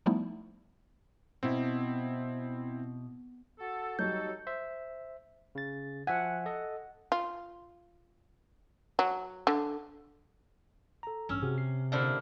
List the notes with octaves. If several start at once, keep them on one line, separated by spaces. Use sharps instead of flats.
F3 G3 A3 B3 D#4 E4
B2 C4 E4
F#4 A4
F#3 G3 D#4 F#4 A4 G6
C5 E5
C#3 A6
F3 E5 F#5 G#5
A4 D#5
F4
F#3
D3
A4 A#5
A1 G2 C#4 E6
C3 F#4 G#4
C7
A#2 D3 E4 G4 C5 E5